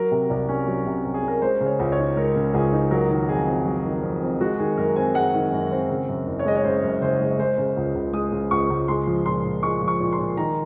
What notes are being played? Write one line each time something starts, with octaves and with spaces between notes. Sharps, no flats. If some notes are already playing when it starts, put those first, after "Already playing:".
Already playing: F#3 A#4
C3
C2
C#4
F#3
C3
C2
G#4
C#4 A#4
G#3 C5
C#3
C#5
C#2
C#5
D#4
G#3 A#4
C#3
C#2 G#4
D#4
F#3 A#4
D#3
F2 G#4
C4
F#3
D#3
F2
C4
G#3 F#4
D#3 G#4
F#2 A#4
C4 G#5
G#3 F#5
D#3
F#2
C4
C#3
F#2
F#1
C#5
G#3 D#5
C#5
C#3 C5
F#2
F#1 C5
G#3
G#3 C5
C#3
C#2
C#2
G#3 D#6
C#3
C#2 C#6
C#2
G#3 C6
F3
A#2 C6
A#2
G#3 C#6
F3
C#6
A#2
C6
A#2
D#3 A#5